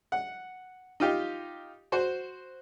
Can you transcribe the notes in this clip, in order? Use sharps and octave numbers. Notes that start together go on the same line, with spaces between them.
F#5
D#4 F4 G4
F#4 C5